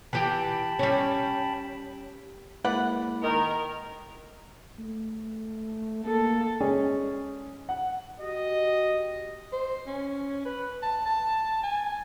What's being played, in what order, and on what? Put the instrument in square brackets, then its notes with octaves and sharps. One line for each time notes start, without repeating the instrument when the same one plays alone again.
[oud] E3 G4 [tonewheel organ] G5 A5 B5
[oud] G3 C#4
[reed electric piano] G#3 A#3 E4 [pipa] B4 D5 F#5
[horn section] D#3 [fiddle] A#4
[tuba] A3
[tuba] A#3 [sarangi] A4
[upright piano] G#3 C#4 G#4 D5
F#5
[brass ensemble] F#4 G4 D#5
[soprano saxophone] C5
C#4
B4
A5
A5
G#5